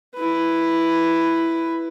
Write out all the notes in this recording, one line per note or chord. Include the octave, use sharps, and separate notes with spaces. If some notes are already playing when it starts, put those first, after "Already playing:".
E4 B4